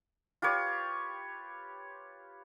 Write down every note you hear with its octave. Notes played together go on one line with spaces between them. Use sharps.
F4 G4 B4 C#5